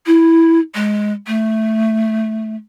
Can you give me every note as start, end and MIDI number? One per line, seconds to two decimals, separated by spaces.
0.06 0.59 64
0.74 1.12 56
1.27 2.55 57